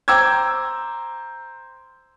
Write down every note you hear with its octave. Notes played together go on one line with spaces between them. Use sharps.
C5 G5 A#5 D6 E6 G#6